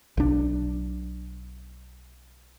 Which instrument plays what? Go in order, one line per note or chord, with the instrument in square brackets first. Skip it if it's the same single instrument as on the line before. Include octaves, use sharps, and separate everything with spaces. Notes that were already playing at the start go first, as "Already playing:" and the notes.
[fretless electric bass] B1 D4